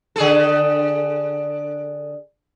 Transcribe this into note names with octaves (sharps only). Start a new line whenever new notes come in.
D3 G#4 A4